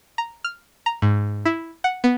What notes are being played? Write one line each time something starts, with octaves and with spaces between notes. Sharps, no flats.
A#5
F6
A#5
G#2
E4
F#5
B3